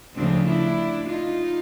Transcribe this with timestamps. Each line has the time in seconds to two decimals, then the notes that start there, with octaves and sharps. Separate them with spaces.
0.15 D2 C#3 F3 C4 D4
0.45 D4 E4
1.06 D#4 F4